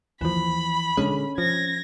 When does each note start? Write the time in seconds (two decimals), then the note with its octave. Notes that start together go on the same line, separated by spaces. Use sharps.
0.21 D#2 E3 F3 B5
0.97 D3 D#3 G#3 C#4
1.38 F3 G#6 A#6